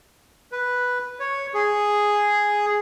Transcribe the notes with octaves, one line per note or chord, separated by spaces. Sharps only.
B4
C#5
G#4